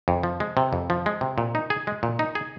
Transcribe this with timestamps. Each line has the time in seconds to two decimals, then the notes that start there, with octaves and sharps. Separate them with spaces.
0.08 F2
0.23 F3
0.40 G#3
0.57 C3
0.73 F2
0.90 F3
1.06 G#3
1.21 C3
1.38 A#2
1.55 D#4
1.70 G#4
1.87 G#3
2.03 A#2
2.19 D#4
2.35 G#4